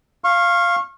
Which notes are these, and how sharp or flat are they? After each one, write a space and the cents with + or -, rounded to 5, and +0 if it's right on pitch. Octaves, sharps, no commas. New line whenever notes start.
F5 -5 C#6 -30